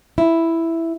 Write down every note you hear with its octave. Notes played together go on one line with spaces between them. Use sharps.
E4